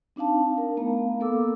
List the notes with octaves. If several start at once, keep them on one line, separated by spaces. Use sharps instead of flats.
C4 D4 D#4 F5 A5
A#4
A3 B3 F5 A#5
A#3 B3 A4 A#4 D6 E6